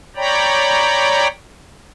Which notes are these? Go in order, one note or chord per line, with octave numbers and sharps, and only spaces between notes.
C#5 D5 G5 A#5 B5